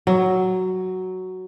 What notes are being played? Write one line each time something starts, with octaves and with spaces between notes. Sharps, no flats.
F#3